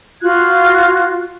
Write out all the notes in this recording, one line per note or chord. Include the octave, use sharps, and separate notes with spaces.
F4 F#4 F#6 G#6